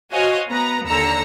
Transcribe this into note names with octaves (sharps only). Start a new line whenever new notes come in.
F#4 C5 C#5 D#5 F5 G#5
B3 B4 A#5
D#2 D3 A#5 E6 C#7